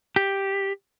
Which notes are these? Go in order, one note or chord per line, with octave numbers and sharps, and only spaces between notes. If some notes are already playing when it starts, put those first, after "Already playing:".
G4